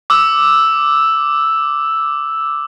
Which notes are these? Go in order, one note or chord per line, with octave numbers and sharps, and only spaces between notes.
D6 E6